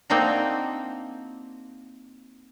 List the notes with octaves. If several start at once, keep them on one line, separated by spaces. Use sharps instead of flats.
A#3 C4 D4 D#4 F4 F#4